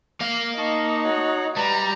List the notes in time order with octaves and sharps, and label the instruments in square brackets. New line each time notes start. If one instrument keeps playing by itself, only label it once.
[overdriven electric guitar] A#3 F5
[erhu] D#4 [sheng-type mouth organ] D#5 A5 C#6
[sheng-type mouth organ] F#4 C#5 F#6
[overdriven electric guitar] G3 [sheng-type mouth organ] B4 [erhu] A#5